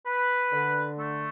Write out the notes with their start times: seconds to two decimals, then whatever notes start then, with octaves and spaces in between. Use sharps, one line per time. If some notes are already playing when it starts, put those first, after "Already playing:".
0.06 B4
0.53 D3
0.99 A3